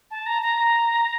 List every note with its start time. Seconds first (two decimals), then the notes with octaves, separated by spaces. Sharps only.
0.11 A5
0.26 A#5
0.42 A#5